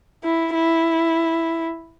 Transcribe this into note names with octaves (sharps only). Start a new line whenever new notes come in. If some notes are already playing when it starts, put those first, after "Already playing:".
E4
E4